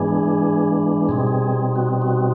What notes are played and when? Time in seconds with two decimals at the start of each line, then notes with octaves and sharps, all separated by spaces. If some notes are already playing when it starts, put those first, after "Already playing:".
Already playing: G#2 E3 G#3 B3 D4 G#4
1.09 B2 G3 C4 D#4 G#4
1.76 F#4
2.02 F#4